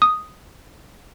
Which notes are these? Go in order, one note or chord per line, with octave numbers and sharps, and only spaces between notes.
D#6